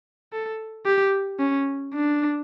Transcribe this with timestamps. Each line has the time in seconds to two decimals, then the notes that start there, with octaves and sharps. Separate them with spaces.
0.33 A4
0.86 G4
1.39 C#4
1.94 D4